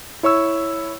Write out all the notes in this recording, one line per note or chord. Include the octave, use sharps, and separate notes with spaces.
E4 C#5 C#6 E6